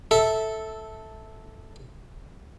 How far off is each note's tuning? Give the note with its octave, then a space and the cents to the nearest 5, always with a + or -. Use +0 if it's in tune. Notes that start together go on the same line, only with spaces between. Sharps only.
A4 +0 E5 -15